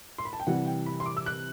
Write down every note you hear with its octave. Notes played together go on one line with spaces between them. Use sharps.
C6
B5
A5
G5
C3 E3 G3 F#5
G5
B5
C6
D6
E6
F#6